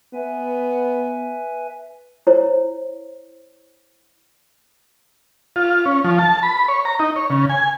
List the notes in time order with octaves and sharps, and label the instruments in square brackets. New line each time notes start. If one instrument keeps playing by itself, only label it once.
[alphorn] B3 [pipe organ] B4 E5 G#5
[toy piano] E4 C5 C#5
[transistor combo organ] F4
C#4
F3
A5
B5
C#5
A#5
D#4
C#5
C#3
G#5